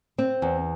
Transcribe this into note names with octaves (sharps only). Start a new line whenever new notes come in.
C4
E2